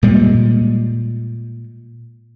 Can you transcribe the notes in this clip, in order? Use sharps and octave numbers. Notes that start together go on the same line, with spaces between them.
A#2 G3 G#3